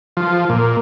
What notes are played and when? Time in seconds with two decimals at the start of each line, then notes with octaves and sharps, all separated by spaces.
0.17 F3
0.49 A#2